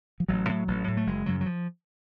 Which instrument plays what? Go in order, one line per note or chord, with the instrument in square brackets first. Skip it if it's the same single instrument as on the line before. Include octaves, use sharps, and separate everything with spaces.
[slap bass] F3
A1 F#3
A2
A1
A2
A3
F#1 G#3
F#2 C#3 F#3
F#3
F3